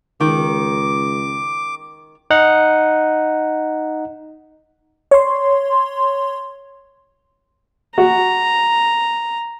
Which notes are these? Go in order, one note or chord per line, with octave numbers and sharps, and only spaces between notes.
C#2 D#3 D6
D#4 F#5
C#5 C6
F#4 A#5